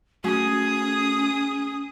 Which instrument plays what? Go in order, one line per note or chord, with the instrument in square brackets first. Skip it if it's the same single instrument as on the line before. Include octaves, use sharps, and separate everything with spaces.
[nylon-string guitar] A3 F#4 [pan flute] C#4 [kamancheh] G#4 D#6